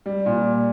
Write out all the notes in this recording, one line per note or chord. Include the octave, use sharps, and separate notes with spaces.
G3
A#2